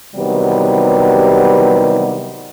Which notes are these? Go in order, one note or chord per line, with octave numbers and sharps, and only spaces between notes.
C3 D#3 E3 F#3 G3 B3